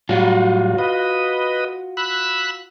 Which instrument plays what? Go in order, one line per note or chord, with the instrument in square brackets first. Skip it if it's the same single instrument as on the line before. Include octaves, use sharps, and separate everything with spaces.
[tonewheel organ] A2 F#3 G3 [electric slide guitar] F4 F#4
[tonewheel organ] B4 D#5
B5 E6 F#6